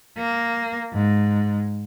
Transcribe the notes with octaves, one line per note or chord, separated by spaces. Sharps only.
A#3
G#2